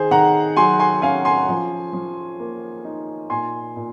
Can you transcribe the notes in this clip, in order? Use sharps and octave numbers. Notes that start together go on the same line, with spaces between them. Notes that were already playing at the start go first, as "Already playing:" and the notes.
Already playing: D#3 G#4 C5
D#3 F#5 A#5
F#3 G#5 C6
G#5 C6
C#4 F5 G#5
G#5 C6
F3
F3
A#3
D#4
A#2 G#5 C6
A#2